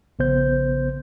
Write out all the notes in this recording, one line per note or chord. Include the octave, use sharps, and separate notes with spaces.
A#1 C#3 B3 C5 G6